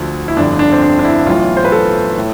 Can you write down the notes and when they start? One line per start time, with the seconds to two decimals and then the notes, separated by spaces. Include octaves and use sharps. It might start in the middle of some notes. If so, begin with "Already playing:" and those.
Already playing: D2 D3 F3 A4
0.28 E4
0.37 G1 F2 D3 D4
0.59 D4
0.72 C4
0.82 D4
0.99 D4
1.04 E4
1.26 B1 A2 E3 F4
1.57 C5
1.65 B4
1.72 A4
2.18 A2